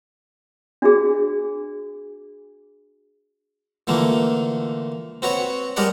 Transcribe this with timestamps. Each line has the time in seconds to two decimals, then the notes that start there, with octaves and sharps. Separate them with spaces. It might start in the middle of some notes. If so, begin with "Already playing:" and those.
0.82 D4 F#4 G#4
3.87 A#2 D3 E3 A3 A#3
5.22 C4 F#4 B4 C#5
5.76 G3 G#3 G4 A#4 D5 F#5